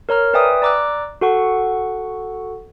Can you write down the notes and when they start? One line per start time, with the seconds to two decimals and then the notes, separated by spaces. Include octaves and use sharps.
0.09 A#4 C#5 A#5 F6
0.34 B4 D5 E5 G5 G#5 D#6
0.62 D5 A#5 D6 E6 F#6
1.21 F#4 A4 F#5 C#6